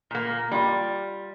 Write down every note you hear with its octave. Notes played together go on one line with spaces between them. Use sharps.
A#2 A#3
G3 F4